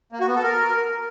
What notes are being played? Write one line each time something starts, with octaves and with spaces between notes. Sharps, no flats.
A#3
F#4
B3
A4
A#4